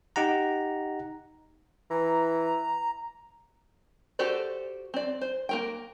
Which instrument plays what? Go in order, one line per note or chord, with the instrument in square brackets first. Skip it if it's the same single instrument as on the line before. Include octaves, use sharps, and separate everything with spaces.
[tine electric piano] D#4 G4 F#5 A#5
[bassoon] E3 [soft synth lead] A#5
[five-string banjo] F#4 G4 A4 C5 D5
C4 D5
C5
A#3 A#4 G5